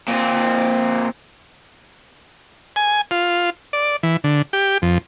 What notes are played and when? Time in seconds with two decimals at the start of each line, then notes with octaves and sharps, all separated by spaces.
0.08 A#2 C4
2.76 G#5
3.11 F4
3.73 D5
4.03 E3
4.24 D3
4.53 G4
4.82 F2